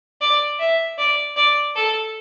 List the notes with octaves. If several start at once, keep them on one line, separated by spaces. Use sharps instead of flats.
D5
E5
D5
D5
A4